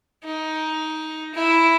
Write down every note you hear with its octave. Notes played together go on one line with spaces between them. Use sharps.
D#4
E4